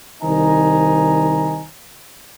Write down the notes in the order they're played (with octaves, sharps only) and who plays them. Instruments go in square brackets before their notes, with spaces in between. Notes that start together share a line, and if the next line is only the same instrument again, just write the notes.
[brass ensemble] C2 D#3 D#4 C5 G#5 A#5